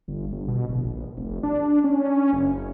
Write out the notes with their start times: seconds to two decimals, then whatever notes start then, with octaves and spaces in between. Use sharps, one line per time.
0.08 G1
0.32 G1
0.48 B2
0.70 D1
0.83 A#1
1.18 F1
1.43 D4
1.84 C#4
2.33 F#1